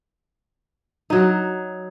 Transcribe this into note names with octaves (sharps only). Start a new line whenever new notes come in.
F#3 D#4